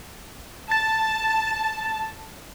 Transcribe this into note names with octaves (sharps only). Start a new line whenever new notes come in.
A5 A6